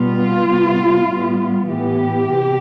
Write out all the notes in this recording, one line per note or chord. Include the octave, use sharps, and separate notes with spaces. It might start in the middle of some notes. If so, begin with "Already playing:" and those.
Already playing: B2 G3 B3 F4
C3 G3 B3
A2 G3 B3
A2 E3 B3 G4
C3